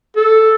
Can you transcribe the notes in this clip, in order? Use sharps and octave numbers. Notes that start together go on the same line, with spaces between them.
A4